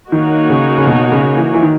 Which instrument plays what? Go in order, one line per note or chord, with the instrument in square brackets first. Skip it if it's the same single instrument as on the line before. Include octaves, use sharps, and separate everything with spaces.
[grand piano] D#3 [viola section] A#3 D#4 F#4 C#5
[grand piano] C#3
C#3
B2
C#3
E3
E3
D#3